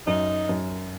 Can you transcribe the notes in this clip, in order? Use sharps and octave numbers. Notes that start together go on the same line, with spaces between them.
F#2 D#4
F#2